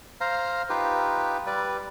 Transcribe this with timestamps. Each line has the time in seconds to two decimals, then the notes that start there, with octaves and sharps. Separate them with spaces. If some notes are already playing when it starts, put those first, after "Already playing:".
0.21 C5 F5 A#5
0.70 D#4 F4 G4 B4
1.46 G3 B4 D5